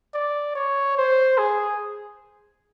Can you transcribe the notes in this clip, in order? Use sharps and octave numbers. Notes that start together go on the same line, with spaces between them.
D5
C#5
C5
G#4